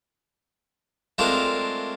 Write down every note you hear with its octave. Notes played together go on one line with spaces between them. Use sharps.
G#3 A3 C4 D4 F4 A#4